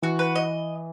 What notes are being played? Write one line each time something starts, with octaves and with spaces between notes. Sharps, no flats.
E3 F#4
B4
D#5